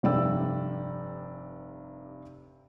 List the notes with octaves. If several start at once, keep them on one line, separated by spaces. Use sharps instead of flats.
F1 G2 C3 D5 G5 E6